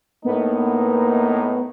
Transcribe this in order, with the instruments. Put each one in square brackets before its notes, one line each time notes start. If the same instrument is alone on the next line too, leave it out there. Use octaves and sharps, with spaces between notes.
[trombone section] A2 D#4 [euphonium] A#3 [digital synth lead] B3